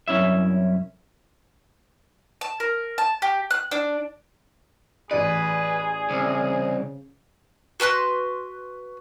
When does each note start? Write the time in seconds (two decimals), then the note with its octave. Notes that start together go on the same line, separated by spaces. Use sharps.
0.08 C2 F#2 C#4 E4 E5
2.41 A5
2.60 A#4
2.98 A5
3.22 G4
3.51 F#6
3.71 D4
5.11 A1 G#4 B4 D5
6.10 C2 C#3
7.80 F#4 B4 C6 F#6